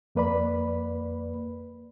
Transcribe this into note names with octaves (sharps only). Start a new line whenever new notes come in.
F2 A#3 B4 D5 B5